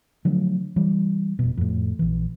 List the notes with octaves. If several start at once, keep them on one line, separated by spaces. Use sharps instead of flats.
D3 F3 F#3 A3
E3 G3
F1 B2
F2 A2
A#1 E3